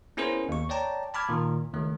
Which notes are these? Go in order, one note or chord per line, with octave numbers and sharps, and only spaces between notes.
B3 C#4 E4 G#4 A#4 C5
D#2 C#6
C#5 D5 G5 A5 A#5
A5 B5 D6 F6 G#6
A#2 D#3
C#2 D#3 A3